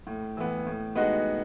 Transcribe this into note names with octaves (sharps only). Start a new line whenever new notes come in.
A2
E3 B3
A2
G#3 B3 D#4 F#4